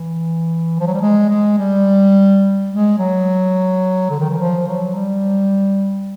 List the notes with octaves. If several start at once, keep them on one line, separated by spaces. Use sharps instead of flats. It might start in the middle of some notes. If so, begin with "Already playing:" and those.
Already playing: E3
F3
F#3
G3
G#3
G#3
G3
G#3
F#3
D3
D#3
E3
F3
F#3
G3